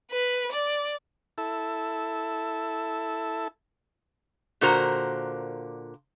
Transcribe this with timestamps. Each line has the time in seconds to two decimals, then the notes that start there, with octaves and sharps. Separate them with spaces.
0.12 B4
0.52 D5
1.38 E4 A4
4.61 A#2 D3 F#4 A#4 C5 A#5